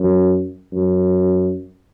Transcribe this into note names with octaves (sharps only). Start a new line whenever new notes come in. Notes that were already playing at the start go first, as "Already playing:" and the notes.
Already playing: F#2
F#2